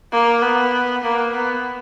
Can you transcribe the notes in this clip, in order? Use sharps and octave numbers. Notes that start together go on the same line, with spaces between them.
A#3
B3
A#3
B3